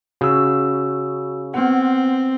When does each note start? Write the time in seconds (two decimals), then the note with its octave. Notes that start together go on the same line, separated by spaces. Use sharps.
0.21 C#3 F#4 E6
1.54 B3 C4 F#5